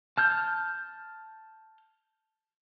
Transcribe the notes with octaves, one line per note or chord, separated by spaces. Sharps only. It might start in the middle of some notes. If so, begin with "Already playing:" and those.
A5 F6 G6